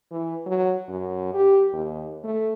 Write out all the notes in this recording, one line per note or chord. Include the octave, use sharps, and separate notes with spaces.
E3
F#3
F#2
G4
D#2
A3